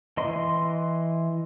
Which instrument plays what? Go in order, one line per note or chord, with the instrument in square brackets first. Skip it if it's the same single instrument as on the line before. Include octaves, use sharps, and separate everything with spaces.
[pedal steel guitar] E3 D#5 C6